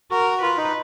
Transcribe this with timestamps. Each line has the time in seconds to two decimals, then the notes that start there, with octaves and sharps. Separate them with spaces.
0.11 F#4 A#4
0.41 F4 B4
0.57 D#4